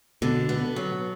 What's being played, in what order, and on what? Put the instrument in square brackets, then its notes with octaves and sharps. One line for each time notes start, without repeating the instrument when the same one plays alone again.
[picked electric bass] B2 [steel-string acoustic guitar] D3
[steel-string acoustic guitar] B3
F#3